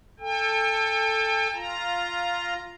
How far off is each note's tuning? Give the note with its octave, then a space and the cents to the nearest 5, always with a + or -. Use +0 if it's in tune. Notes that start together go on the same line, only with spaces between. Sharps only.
A4 +5 G5 +40
F4 +0 A#5 +0